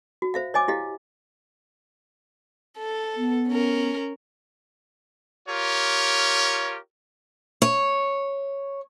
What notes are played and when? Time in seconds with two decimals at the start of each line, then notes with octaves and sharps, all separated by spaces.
0.22 F#4
0.34 C5 E5 F5
0.54 C#5 D#5 G#5 D6
0.68 E4 G4 D#5 F5
2.77 A4
3.16 B3
3.48 C#4 A#4
5.48 F4 G4 A#4 C#5
7.62 C#5